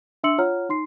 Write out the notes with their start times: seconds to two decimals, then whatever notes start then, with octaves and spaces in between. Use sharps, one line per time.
0.24 D4 E5 C6 E6 C#7 F#7
0.38 F4 C#5 F#5 A#5 F6
0.69 D#4 C6 C7